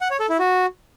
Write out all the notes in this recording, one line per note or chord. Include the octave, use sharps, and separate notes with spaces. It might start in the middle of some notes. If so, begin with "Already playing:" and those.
F#5
C#5
A4
E4
F#4